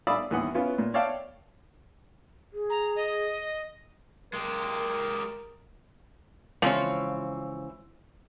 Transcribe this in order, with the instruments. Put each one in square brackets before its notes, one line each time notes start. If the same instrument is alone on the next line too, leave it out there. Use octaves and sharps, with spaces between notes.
[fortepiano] D5 E5 F5 B5 D#6 E6
D#2 E3 B3 F#5 D#6
B3 C#4 E4 F4 B4
A#2
C#5 D5 E5 F5 G5 A5
[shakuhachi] G#4
[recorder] A#5
D#5
[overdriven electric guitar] G#3 G4 [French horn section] A#4
[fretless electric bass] C#3 G#3 [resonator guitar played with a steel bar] E3 C4 C#5 [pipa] F3